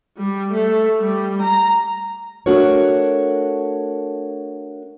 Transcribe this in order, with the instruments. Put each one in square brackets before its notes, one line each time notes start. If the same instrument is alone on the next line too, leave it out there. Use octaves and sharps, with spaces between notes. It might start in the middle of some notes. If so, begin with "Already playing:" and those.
[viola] G3
A3
G3
A#5
[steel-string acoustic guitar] A3 D4 F#4 A#4 C#5